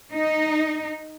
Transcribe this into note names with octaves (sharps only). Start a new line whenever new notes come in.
D#4